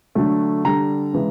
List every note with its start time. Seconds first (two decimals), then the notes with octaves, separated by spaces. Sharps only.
0.15 D3 F#3 A3
0.64 D3 G3 A#5
1.13 C#3 E3 G#3